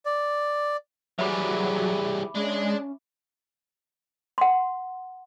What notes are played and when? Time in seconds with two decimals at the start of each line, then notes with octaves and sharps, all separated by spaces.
0.06 D5
1.19 E3 F#3 G3 G#4 E5 B5 D6
2.36 G#3 C#4 D4
4.38 F#5 C6